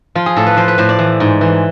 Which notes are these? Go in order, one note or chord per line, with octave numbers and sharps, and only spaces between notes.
F3 F4
G#4
A2 A4
B4
F3 C5
B4
A2 C5
D5
E3
G#2
E3